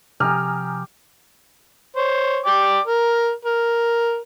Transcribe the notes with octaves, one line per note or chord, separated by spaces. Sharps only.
C3 F3 G4 G#5 A#5 D#6 F6
C5 C#5
D5 G5 D6
A#4
A#4